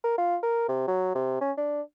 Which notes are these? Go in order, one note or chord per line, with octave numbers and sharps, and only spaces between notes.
A#4
F4
A#4
C3
F#3
C3
C#4
D4